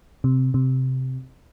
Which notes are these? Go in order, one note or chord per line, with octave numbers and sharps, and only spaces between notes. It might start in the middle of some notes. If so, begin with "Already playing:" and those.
C3
C3